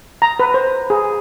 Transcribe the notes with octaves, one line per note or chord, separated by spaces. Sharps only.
A#5
B4
C5
G#4